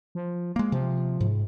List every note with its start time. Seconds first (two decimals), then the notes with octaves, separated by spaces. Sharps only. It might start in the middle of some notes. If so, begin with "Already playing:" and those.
0.15 F3
0.56 G#3 A#3
0.72 C3 F3
1.21 G#2